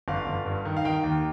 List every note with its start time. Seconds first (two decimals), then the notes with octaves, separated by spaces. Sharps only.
0.08 G1 F5
0.27 G1
0.46 G2
0.65 D#3
0.77 F5
0.85 D#3 G5
1.04 D#2